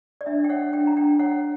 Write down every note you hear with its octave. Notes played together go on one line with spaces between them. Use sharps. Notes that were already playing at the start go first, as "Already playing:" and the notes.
D5
D4 E5
G5
C#5 F#5
D4 G5
A#5
D4 G5
C#5 F#5